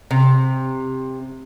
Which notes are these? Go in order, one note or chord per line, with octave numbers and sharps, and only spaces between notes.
C3